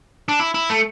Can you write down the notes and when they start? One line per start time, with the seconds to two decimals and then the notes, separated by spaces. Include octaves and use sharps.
0.29 D4
0.40 E4
0.54 E4
0.70 A3